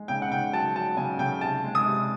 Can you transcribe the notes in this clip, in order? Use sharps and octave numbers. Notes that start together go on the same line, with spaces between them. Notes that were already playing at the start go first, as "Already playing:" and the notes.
Already playing: G#3
C#3 G5
F#5
C#3 G5
F#3 A5
F#3 A5
C#3 G#5
C#3 G5
C3 A5
G#3
D#6
C3